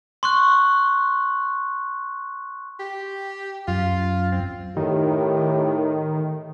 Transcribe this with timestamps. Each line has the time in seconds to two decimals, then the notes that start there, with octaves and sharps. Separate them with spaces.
0.23 C6 C#6 F#6
2.80 G4
3.68 F#2 F4
4.32 C4
4.77 A2 D#3 G4